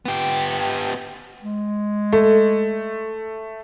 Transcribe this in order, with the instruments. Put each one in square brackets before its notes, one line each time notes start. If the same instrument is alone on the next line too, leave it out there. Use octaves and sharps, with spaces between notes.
[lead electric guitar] B3 G4
[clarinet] G#3
[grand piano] A3